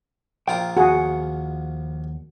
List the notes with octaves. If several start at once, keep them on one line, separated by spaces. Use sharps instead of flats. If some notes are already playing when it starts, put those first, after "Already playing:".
A#1 F4 G5 A#5
D#2 F#4 G#4 F#5